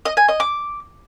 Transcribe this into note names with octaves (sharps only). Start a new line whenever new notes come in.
D#5
G#5
D#5
D6